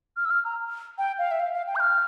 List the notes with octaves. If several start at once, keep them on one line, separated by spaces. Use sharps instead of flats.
F6
E6
F6
A#5
G5
F5
E5
F5
F5
G5
G6
F6